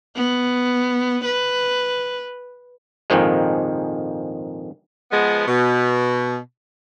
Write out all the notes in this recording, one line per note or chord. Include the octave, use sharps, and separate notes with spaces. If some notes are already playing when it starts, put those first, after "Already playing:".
B3
B4
A#1 F2 G#2 D#3 F3 G#3
F3 G#3 B3
B2